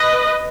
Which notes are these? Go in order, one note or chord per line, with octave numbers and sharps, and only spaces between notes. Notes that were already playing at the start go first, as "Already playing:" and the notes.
Already playing: B4 D#5